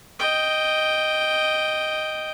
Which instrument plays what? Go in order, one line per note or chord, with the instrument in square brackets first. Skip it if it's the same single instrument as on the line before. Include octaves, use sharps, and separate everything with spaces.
[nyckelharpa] D#5 G5